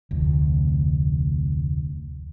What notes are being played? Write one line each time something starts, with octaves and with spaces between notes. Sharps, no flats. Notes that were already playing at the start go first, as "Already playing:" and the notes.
F1 D2